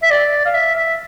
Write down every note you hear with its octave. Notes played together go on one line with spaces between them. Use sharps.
E5
D5
F5
E5
E5